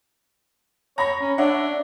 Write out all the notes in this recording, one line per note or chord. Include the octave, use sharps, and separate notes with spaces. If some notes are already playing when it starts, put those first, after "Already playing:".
C#5 A#5 B5 A#6
C#4
D4 C#5 E5 F#5